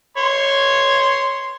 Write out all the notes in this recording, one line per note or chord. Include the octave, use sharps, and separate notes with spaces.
C#5 C6